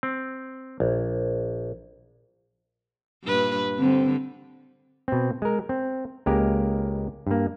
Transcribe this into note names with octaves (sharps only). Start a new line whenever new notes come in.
C4
A#1
G2 A#2 B4
D3 G3 C4
B2 C4
G#3 A#4
C4
C#2 G#3 A#3 G4 A#4
G2 A#3